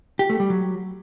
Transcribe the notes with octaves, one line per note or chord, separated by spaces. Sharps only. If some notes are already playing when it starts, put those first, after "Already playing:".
G4
A3
G3
F#3